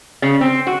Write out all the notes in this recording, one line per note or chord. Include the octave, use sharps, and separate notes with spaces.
C#3
C4
F#4